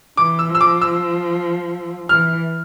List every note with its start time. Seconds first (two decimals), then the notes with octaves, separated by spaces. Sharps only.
0.17 E3 D6
0.39 E6
0.50 F3 E6
0.61 D6
0.82 E6
2.09 E3 F6